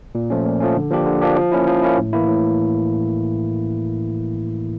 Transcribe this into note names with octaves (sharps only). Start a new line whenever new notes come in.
A#2
F3 A3 C#4
A#2
F3 A3 C#4
D3
F3 A#3 D4 G4
D3
F3 A#3 D4 G4
F3
A#3 C#4 E4
F3
A#3 C#4 E4
A2
E3 A#3 E4
A2